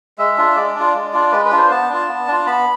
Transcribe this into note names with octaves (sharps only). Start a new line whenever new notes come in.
G#3 E5
D4 F4
G#3 D5
D4 F4
G#3
D4 F4
G#3 B4
B4
D4 F4
C5
B3 A5
D4 F4
B3
D4 F4
B3 B5